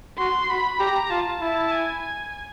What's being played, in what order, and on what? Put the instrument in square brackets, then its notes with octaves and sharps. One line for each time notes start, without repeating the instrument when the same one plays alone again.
[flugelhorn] F#4 [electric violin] C6
[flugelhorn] F#4 [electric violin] B5
[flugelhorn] G4 [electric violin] A#5
[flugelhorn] F4 [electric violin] A5
[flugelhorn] E4 [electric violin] A5
[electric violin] G#5
G#5